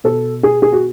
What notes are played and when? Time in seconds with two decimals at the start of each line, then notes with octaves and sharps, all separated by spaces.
0.04 B2 A4
0.43 G#4
0.62 G#4
0.72 F#4